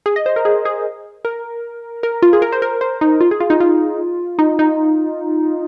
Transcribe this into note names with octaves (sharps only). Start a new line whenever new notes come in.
G#4
D#5
C5
A#4
G#4
G#4
A#4
A#4
F4
G#4
A#4
C5
A#4
C5
D#4
F4
G#4
F4
D#4
F4
D#4
D#4